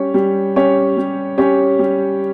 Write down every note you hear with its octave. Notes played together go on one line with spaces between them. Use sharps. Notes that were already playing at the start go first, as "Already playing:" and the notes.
Already playing: G3 C#4 G4 C#5
G3
C#4 G4 C#5
G3
C#4 G4 C#5
G3